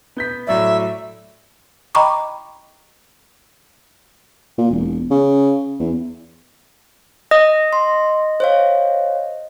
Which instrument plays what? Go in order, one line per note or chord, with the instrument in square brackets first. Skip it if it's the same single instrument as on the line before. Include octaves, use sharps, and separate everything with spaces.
[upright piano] B3 G6 B6
[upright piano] A2 F#3 D5 [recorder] E5
[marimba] D#5 G5 A#5 B5 C#6 D6
[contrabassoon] A#2
E1
C#3
E2
[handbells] D#5 [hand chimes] D#6
[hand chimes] C6
C5 C#5 F5